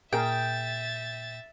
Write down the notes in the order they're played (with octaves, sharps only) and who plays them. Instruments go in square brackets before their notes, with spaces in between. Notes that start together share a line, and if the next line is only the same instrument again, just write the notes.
[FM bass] A#2 [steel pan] G#4 A#4 [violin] E5 A6 [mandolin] G5